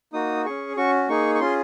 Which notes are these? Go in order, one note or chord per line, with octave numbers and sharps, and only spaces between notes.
A#3 D#4 F#4 D#6
C#4 G#4 C#6
C#4 F#4 C#6
A#3 D#4 G#4 C#6
C#6
C#4 F4 G#4 C6